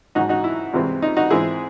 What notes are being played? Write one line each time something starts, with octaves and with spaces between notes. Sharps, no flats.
G#1 G#2 F#3 D#4 F#4
D#4 F#4
E4
C2 C3 E3 G#3 C4
D#4
D#4 F#4
G#2 E3 G#3 C4 E4 G#4